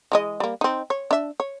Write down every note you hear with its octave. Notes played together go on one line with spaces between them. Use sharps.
E3 G#3 D#5
G3 A#3
C4 D#4
C#5
D4 E5
C#5